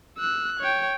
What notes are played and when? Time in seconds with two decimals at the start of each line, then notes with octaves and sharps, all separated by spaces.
0.18 E6 F#6
0.60 C#5 G5